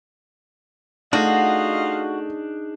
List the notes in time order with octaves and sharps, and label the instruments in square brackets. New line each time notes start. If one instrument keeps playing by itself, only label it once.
[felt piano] A3 [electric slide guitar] D4 D#4 G#4 [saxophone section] F4 D#5 F5 [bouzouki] F#4